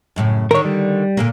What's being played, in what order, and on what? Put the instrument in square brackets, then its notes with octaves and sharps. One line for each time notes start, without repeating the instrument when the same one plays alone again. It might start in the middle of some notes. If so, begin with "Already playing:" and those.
[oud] F#2 A2 C#3
[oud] D3 D#3 [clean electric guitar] A#4 C#5
[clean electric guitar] G3
[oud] A#2 D3 A#3